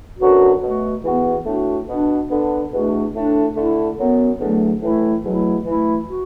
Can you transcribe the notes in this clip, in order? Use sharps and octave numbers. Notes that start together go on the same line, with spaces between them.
F#2 D3 F#3 B3 F#4
B2 A3 F#4
E2 E3 B3 F#4
A2 A3 D4 F#4
B2 B3 D4
D3 B3 D4
E2 B2 A3 D4 F#4
A2 A3 D4
D3 A3 E4
F#2 F#3 B3
E2 D3 F#3 A3
A2 E3 A3 E4
E2 B2 F#3 A3 E4
E3 A3 E4
F#4